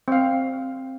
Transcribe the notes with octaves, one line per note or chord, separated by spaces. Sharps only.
C4 F5